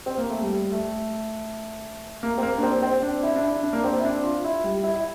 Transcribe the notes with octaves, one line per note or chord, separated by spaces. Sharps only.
C4
A#3
A3
G3
A3
A#3
C4
A#3
D4
C4
C4
D4
E4
D4
E4
D4
A#3
C4
E4
D4
F4
E4
G3
E4
E4